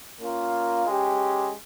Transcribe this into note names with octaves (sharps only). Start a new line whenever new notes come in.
A#3 C#4 F4 A#4
G#3 C#4 G4